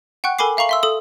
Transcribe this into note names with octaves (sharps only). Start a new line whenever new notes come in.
F#5 G5 C#6 F#6
A4 A#4 G#5 B5 D6 C7
E5 F5 A#5 C#6 F#7
E5 C6 E6
A4 D#6